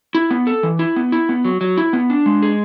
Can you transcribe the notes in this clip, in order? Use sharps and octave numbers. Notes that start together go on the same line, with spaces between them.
E4
B3
A4
E3
E4
B3
E4
B3
F#3
F#3
E4
B3
D4
G#3
G#4